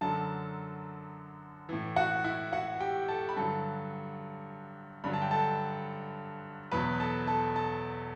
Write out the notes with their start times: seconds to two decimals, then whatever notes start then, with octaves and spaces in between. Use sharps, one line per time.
0.01 F#2 D3 F#3 A4 A5
1.69 A2 E3
1.96 F#4 F#5
2.24 E4 E5
2.53 F#4 F#5
2.80 G4 G5
3.08 A4 A5
3.29 B5
3.36 G2 D3 F#3 A4 A5
5.04 G2 D3 F#3 B5
5.13 A5
5.22 G5
5.31 A4 A5
6.72 E2 B2 F#3 B4 B5
7.00 A4 A5
7.27 A4 A5
7.56 A4 A5